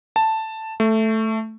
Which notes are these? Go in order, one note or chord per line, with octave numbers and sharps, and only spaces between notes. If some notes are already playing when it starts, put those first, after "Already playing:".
A5
A3